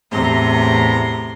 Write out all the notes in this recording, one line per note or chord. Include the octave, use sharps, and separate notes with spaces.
E2 A2 C3 A#5 C6